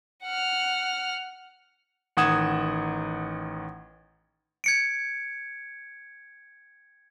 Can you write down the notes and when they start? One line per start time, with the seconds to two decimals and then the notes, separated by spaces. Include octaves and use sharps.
0.24 F#5 F6
2.17 A1 D#3 F#5 D#6 G#6 E7
4.64 G#6 C#7 D7